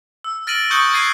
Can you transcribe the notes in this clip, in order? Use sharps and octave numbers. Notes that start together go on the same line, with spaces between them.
E6
F6 A6 A#6 D7 D#7 F#7
C#6 D#6 F#6 G6 C#7 G7
G#6 A6 C7 D#7